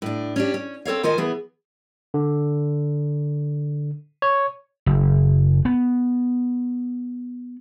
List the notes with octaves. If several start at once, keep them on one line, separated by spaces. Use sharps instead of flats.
A2 D4
C#4 D4 G4
C#4
C4 A4 C#5 F5
D#3 F4 C5 D#5 G#5
E3 B3 G#4
D3
C#5
F#1
B3